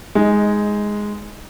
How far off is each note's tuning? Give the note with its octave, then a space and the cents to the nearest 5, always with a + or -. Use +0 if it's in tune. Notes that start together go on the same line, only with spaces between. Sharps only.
G#3 +0 D#4 +15